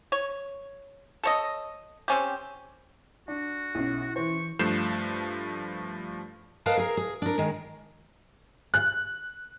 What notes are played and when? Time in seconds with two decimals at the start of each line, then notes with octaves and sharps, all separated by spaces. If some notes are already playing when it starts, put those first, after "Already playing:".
0.12 C#5
1.24 A4 C#5 D#5
2.08 C4 C#4 G4
3.28 D4 F#4
3.75 B1 C#4 E4
4.16 E3 C5 C#6
4.59 G2 F3 A3 G6 C7 E7
6.66 A#4 B4 D#5 F5 A5
6.77 G#4 A#4
6.97 G#4
7.22 D4 A#4
7.38 D#3 G#3
8.74 F#6